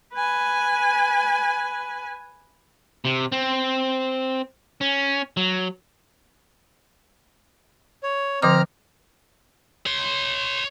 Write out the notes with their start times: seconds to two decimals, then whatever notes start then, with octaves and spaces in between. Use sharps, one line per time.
0.14 B4 G#5
3.05 C3
3.32 C4
4.81 C#4
5.37 F#3
8.03 C#5
8.42 D3 F3 C4 A#5 D6 F6
9.86 C#5 C6